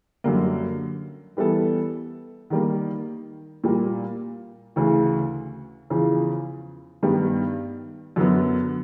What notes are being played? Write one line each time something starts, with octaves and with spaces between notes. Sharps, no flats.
F#2 D3 G3 A#3
E3 G3 B3 E4 A4
D#3 G3 A#3
A#2 G3 A#3
D2 C#3 E3
E2 C#3 F3
G2 D#3 G3 B3
F#2 D3 F#3 B3